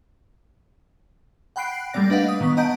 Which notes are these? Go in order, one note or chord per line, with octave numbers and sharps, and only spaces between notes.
F#5 G5 B5 F#6 C7 D7
G3 A3 A#3 D5 A#6
D4 B4 D#5 F5 F#5
D#6
D#3 F#3 B3 D#6
D#5 F#5 A5 A#5 G6 D7